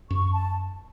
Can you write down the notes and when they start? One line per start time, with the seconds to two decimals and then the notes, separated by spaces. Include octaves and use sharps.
0.10 F#2 C#6
0.33 A5